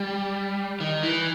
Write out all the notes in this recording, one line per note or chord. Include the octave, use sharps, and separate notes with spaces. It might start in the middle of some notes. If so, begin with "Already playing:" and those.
Already playing: G3
D#3
E3